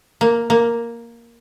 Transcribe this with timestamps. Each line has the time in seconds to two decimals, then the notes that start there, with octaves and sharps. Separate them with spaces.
0.21 A#3
0.50 A#3